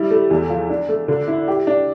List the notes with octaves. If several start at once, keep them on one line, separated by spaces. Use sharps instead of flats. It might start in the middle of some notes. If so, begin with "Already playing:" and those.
Already playing: G3 E4
A3
E2
F3
D4
A3
D3
E4
G4
D4